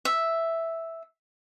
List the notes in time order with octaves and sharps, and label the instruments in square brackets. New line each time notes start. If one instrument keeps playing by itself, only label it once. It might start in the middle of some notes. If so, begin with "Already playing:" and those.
[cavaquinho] E5